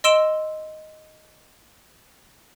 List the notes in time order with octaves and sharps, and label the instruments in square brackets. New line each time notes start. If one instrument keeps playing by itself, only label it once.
[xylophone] D#5 C6 E6 D7 E7 G7